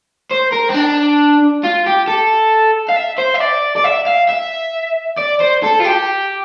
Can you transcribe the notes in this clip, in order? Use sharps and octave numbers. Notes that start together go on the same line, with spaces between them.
C5
A#4
C4
D4
F4
G4
A4
F5
E5
C5
E5
D5
D5
E5
F5
E5
D5
C5
A4
F4
G4